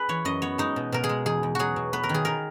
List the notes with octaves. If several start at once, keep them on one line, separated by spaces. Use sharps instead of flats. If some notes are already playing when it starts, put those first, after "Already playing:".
Already playing: G#4 B4
E3 C#5
F#2 D#5
B3 C#5
G#3 D#4
B2
B2 A#4
G#4
G#3
E2 G#4
E2
F#3 F#4 G#4
B2
B3 B4
A#4
D#3
G#4
D#3 A#4